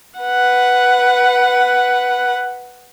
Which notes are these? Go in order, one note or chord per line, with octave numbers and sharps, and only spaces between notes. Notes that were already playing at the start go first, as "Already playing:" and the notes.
B4 F#5